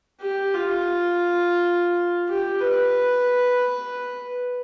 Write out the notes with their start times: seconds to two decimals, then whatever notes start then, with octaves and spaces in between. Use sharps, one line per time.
0.20 G4
0.54 F4
2.28 G4
2.63 B4